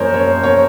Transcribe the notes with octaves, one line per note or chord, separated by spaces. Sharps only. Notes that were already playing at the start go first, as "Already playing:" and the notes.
Already playing: F#2 F3 A#3 A#4 C5 C#5
C#5
C#5